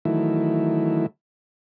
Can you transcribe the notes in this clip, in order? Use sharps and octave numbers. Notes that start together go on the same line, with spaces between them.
D#3 E3 F#3 A3 E4